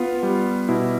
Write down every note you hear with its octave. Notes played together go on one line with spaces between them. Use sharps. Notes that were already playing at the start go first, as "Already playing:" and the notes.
Already playing: B3 F4
G3
B2 E4